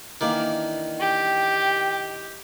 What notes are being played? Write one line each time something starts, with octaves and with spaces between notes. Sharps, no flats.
D#3 E3 A#3 D4 D5
G4 G5